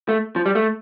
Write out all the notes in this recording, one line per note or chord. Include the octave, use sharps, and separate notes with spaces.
A3
F3
G3
A3